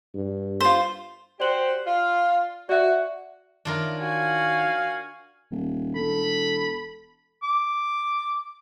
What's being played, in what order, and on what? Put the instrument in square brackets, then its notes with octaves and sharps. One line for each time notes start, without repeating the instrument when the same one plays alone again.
[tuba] G2
[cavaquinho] F4 C5
[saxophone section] F#4 G4 C5 [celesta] D5 F#7
[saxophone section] F4 F5
[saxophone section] F#4 [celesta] D5 E5
[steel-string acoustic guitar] D#3 C#5 [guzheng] D4 F4 A#4
[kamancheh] F#4 G#5 [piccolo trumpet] F5
[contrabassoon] D#1
[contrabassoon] E1 [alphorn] A4 [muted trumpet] B5
[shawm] D6